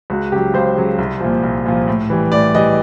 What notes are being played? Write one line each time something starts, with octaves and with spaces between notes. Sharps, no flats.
C#2 F#4
C#3 F#3 G4
C#2 C5
C#3 F#3
C2
A#2 F3
C2
A#2 F3
A2
E3 G3
A2 D5
E3 G3 D#5